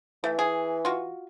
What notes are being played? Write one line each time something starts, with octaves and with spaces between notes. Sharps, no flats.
E3 A3
G#4
F4 F#4